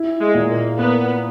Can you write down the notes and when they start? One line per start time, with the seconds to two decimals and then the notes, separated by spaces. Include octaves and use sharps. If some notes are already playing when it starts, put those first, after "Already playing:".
Already playing: E4
0.20 G#3
0.34 A#2
0.49 A#3
0.78 A#3 B3